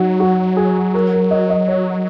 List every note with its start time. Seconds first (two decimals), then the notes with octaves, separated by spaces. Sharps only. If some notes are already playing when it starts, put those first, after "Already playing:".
Already playing: F#3 D#4 F#4
0.20 F#4
0.57 G#4
0.94 A#4
1.13 A#4
1.31 D#5
1.50 D#5
1.68 C#5